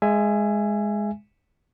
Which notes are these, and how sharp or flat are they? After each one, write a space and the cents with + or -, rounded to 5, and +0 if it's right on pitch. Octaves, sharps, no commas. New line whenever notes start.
G#3 +0 E5 +25 G#5 +0